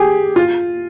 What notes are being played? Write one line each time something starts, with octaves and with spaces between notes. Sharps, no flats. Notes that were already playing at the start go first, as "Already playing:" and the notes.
Already playing: G4 G#4
F4